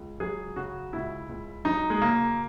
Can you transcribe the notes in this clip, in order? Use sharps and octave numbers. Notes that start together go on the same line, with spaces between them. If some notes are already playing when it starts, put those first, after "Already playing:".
Already playing: C#2
F#3 G#4
C#3 F#4
C#2 E4
C#2
F#3 D#4
G#3
C#3 A#3